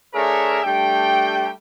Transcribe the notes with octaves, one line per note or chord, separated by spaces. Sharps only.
A3 D4 G#4 A#4 C#5 E5
G3 A3 D4 G5